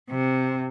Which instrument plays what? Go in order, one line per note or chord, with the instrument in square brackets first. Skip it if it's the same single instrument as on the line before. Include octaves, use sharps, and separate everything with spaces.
[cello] C3